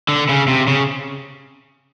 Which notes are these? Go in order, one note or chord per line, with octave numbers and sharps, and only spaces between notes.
D3
C#3
C3
C#3